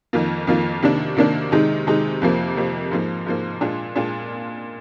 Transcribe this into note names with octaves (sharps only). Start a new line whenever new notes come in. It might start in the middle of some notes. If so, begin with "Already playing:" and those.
F2 D#3 A#3 F4
F2 D#3 A#3 F4
C3 D#3 A#3 D4
C3 D#3 A#3 D4
C3 D#3 G#3 D#4
C3 D#3 G#3 D#4
F2 C3 F3 A#3
F2 C3 F3 A#3
G#2 F3 A#3
G#2 F3 A#3
A#2 G#3 D4 F4
A#2 G#3 D4 F4